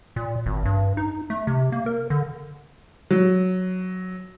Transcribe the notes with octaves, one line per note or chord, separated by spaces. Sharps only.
A#2
G#1
G2
D#4
A3
C3
A#3
A#4
D3
F#3